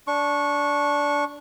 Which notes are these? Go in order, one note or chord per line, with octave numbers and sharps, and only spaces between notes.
D4 C#6